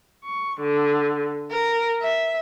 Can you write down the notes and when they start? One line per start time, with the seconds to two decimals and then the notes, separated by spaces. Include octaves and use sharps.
0.24 C#6
0.62 D3
1.51 A#4
2.01 E5